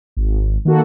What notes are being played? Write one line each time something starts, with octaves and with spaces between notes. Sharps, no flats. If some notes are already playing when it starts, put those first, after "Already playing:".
G#1
D#3 A#3 F#4 A4